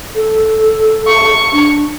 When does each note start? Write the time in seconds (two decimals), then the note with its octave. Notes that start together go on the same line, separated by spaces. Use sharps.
0.16 A4
1.08 C#6
1.52 D4